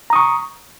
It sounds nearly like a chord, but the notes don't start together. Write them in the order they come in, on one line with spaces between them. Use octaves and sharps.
A#5 D#6 C#6